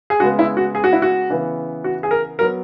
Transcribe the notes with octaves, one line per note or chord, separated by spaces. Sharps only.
G#4
C#3 G#3 B3 F#4
E4
F#4
G#4
F#4
E4
F#4
C#3 E3 B3
F#4
G#4
A#4
F#3 B3 A#4